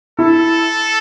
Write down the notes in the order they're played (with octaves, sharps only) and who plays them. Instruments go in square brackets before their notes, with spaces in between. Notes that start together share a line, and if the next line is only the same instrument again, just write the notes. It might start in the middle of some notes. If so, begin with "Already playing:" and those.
[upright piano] E4 [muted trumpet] A4